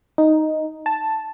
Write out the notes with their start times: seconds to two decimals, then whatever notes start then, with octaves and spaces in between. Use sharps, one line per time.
0.18 D#4
0.86 A5